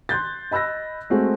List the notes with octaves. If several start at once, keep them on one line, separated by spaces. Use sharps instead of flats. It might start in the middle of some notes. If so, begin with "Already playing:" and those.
C6 F#6 G6 A6
D#5 B5 E6 F#6 A#6
G#3 A3 C4 F#4 G#4